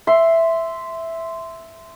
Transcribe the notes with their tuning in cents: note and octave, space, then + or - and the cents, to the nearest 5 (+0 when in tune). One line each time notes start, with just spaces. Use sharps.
E5 +0 C6 -10